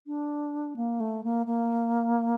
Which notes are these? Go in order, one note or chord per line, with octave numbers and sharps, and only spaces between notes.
D4
A#3
A3
A#3
A#3